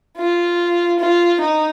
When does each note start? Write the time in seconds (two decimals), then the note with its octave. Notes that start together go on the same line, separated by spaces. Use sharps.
0.17 F4
0.99 F4
1.40 D#4